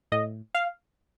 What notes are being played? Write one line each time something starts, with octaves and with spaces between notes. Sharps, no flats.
A2 D#5
F5